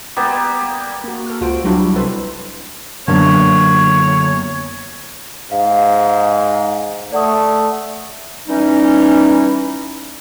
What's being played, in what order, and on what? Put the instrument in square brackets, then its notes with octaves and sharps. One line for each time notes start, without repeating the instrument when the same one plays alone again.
[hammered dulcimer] G3 A#3 B3 G4
[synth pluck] A#3 F#4
A4 F6
C#2 F4 F#4 C5 D7
F#3 G3 D4 E4 F#4
C2 C3 A4 B4 C5
[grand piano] F#2 A#3 D4 [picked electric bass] D3 B3 [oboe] C#5
[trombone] G#2 [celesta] F5
[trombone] A3 [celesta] D5 F#5 D#6
[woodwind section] E3 G3 C#4 D#4